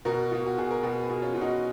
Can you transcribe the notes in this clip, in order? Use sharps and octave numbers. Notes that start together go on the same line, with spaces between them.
B2 F#4 A#4
B2 F4
F#4
B2 G#4
A#4
B2 G#4 B4
G#4 B4
B2
C#4 F4
B2 F4
D#4 F#4